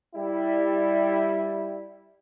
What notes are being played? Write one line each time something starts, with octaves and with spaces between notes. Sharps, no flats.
G3 E4